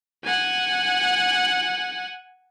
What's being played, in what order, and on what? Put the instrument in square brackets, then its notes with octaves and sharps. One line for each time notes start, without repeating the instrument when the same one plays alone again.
[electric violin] F#5 G#5